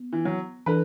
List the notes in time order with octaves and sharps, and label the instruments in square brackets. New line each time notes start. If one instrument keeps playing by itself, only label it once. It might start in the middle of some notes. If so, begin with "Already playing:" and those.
Already playing: [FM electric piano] B3
[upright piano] E3
F#3
[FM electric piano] E3 D4 A4 [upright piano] B4